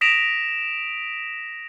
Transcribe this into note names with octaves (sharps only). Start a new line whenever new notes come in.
D#6 A#6 B6 D7 E7 F7